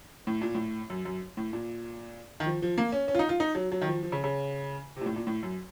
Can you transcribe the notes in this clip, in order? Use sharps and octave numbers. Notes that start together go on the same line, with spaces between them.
A2
A#2
A2
F#2
F#2
A2
A#2
D#3
F3
F3
A#3
C#4
C#4
F4
D#4
F4
D#4
F#3
F#3
D#3
F3
F3
C#3
C#3
C3
A#2
A2
A#2
A2
F#2